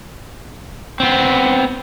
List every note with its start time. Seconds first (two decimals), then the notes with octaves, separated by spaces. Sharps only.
1.00 B3 C4